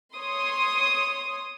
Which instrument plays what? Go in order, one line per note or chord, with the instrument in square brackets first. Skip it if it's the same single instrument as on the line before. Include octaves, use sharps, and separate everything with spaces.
[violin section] C#5 C6 D#6